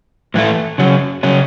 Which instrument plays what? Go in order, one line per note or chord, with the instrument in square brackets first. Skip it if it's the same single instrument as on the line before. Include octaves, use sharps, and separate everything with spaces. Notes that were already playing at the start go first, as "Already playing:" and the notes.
[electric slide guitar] A2 E3 A3
C#3 F#3 C#4
C#3 F#3 C#4